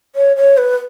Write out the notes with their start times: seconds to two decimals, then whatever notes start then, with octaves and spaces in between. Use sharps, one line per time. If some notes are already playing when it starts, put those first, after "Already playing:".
0.16 C#5
0.37 C#5
0.57 B4